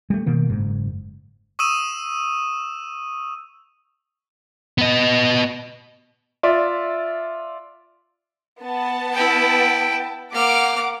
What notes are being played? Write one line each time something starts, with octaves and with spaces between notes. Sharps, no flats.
G3 A3
B2 D#3 A#3
F#1 G#2
C#6 D#6 E6 D#7 E7
B3 D#5
F4 D5 E5
B3 A5
E4 G5
A#3 F#5 D6 F6